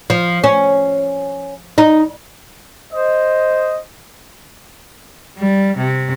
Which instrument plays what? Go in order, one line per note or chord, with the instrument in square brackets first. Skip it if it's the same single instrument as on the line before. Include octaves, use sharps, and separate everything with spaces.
[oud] F3
C#4
D#4
[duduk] C5 [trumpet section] D#5
[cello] G3
C3